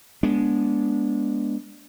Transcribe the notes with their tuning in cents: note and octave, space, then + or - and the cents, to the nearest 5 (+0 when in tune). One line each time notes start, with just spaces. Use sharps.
G#3 +0 B3 -25 D4 -15